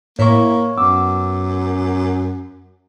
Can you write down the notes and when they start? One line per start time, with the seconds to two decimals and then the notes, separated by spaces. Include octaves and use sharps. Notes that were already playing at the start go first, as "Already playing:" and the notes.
0.19 A2 A#3 E4 C#5 C#6
0.77 F#2 B3 D6 E6